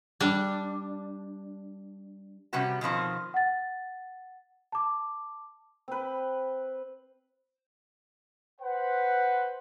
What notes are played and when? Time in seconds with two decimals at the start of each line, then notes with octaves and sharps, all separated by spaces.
0.20 G3 D4
2.53 C3 G3 B3 C#4 F#4
2.81 B2 D#3 F3 C4
3.34 F#5 A6
4.72 A5 D6
5.88 C4 B4
8.60 B4 C5 F#5